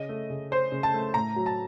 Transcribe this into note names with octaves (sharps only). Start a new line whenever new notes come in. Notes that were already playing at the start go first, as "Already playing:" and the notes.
Already playing: C#3 D#5
A3
C#3
C#4 C5
C#3
A5
A3
A2 A#5
F#3
A5